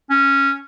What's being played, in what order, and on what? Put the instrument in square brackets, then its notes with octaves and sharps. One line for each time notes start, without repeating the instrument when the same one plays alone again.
[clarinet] C#4